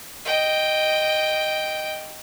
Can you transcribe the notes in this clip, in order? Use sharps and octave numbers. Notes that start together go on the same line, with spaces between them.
D#5 G5